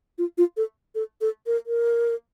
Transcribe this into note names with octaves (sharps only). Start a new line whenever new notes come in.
F4
F4
A4
A4
A4
A#4
A#4